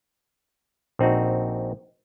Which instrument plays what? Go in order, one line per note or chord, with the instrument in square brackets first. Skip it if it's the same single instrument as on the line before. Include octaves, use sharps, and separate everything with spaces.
[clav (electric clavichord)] A#1 C4 D#4 F#4